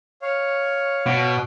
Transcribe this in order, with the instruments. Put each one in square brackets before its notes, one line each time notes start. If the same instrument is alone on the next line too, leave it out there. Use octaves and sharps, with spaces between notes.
[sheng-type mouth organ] C#5 F5
[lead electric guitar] B2